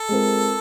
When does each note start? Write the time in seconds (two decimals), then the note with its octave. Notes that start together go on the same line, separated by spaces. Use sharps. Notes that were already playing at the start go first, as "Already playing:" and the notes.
Already playing: A4
0.09 G#3 C4 F4 A#4